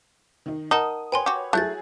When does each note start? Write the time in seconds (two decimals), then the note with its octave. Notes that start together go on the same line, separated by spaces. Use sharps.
0.46 D#3 D#4
0.71 D#4 A#4 F#5 A5 D#6
1.12 B4 C#5 G5 G#5 C6
1.26 F#4 G4
1.53 F#3 A3 E4 G#4 F#6 G6 A6